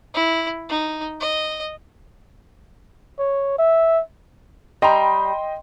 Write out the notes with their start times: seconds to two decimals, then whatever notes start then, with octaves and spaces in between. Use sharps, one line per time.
0.14 E4
0.69 D#4
1.20 D#5
3.19 C#5
3.59 E5
4.82 G3 D#5 G5 A#5 C6